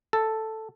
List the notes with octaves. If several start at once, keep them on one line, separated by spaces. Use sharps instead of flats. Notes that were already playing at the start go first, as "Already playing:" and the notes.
A4